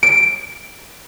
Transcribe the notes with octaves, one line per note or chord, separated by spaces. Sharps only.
D7